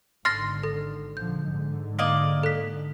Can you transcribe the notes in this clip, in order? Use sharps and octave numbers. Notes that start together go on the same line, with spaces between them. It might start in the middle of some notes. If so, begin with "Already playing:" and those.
G#1 D3 C6 F6 A6 A#6
A4
A#1 D3 F3 G6
G#2 D3 G#3
A#3 D5 D#5
A4 F#6 B6